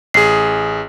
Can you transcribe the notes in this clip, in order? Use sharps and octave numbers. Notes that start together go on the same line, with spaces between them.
A1 G#4 C7